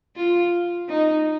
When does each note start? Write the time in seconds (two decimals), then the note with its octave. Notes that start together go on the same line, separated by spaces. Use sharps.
0.16 F4
0.89 D#4